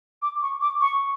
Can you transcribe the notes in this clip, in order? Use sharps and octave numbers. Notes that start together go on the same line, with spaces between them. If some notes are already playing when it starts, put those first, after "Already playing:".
D6
C#6
D6
C#6